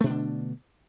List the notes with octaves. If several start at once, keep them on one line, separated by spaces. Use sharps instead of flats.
B2 D3 A3 D4